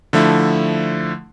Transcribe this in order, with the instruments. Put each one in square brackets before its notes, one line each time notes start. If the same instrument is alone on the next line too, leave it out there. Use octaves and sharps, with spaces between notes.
[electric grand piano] D3 F3 A3 E4